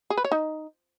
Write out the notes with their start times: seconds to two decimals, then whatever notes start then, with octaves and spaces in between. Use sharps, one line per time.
0.10 G#4
0.17 B4
0.24 C#5
0.32 D#4